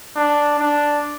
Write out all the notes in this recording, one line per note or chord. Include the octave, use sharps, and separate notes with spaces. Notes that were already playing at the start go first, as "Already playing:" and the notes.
D4
D4